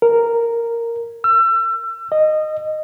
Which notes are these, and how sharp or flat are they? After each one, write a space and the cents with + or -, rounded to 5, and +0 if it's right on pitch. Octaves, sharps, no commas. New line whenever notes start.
A#4 -5
E6 +35
D#5 -10